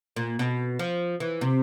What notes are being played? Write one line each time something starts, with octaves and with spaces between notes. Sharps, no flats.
A#2
B2
F3
E3
C3